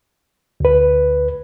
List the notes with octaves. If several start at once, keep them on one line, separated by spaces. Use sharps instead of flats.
D2 B4